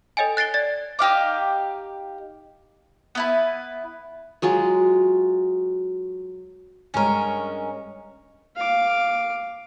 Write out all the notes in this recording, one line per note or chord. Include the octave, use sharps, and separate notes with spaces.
A4 C#5 D#5 G5 G#5
F#6 A6 C7 D7 G7
D5 A6
D#4 G4 F5 D6
B3 E4 B4
F#3 G#3 F4 F#4
G2 G#3 C#4 A#4 C#5
F5 D6